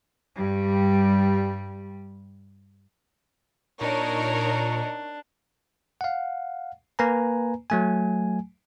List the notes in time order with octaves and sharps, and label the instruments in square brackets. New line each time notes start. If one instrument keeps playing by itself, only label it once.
[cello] G2 G3
[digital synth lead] A#2 [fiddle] D4 [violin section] D#4 A#4 C#5
[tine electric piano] F5 F#5
A#3 B4 G#5 A#5
F#3 A3 G#5